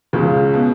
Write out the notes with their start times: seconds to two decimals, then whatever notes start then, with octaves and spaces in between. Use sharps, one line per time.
0.13 C#2 C#3
0.54 B2